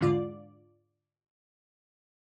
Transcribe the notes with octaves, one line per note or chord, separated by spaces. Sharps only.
E2 G#2 D3 F4 D5